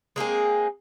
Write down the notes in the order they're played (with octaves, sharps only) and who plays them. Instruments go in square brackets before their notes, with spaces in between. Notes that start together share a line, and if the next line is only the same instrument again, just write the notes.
[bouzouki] G#3 A#3 C4 G#4